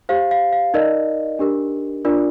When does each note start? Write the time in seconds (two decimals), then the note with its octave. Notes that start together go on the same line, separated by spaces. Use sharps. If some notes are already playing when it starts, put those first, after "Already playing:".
0.09 G4 C5 F5
0.31 F5
0.53 F5
0.74 D#4 A#4 D5 D#5
1.39 D4 G4 A#4
2.05 D4 F4 A#4 D5